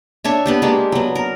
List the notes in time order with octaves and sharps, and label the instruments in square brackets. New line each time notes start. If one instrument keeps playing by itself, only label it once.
[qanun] D4 C#5 E5
B3 D4 G4
G#3 A#3 D4 G4
F#3 B3
A#4